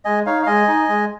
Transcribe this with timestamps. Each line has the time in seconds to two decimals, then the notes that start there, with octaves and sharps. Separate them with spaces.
0.05 G#3 D#5 G#5
0.26 D#4 C#5 F5
0.43 F5
0.46 G#3 D#5 G#5
0.68 D#4
0.89 G#3